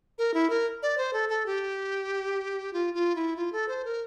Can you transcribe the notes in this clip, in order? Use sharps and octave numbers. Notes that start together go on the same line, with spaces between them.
A#4
E4
A#4
D5
C5
A4
A4
G4
F4
F4
E4
F4
A4
C5
A#4